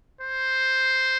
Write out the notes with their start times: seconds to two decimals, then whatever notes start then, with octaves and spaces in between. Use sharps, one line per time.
0.21 C5